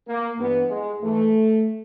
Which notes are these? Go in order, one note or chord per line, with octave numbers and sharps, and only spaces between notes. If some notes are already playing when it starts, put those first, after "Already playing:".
A#3
G2 E3 B3
G#3
G#2 E3 A3